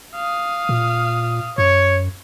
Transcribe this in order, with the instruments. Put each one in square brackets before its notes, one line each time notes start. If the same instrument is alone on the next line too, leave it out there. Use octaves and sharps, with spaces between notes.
[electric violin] F5 D#6
[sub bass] A#2
[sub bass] F#2 [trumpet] C#5